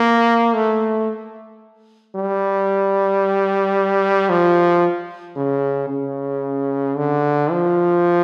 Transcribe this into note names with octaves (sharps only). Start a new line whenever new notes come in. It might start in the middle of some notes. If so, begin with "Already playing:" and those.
Already playing: A#3
A3
G3
F3
C#3
C#3
D3
F3